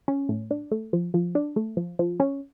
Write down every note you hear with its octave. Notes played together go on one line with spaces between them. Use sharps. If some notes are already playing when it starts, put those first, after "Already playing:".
C#4
A2
D4
A3
F3
F3
D4
A3
F3
F3
C#4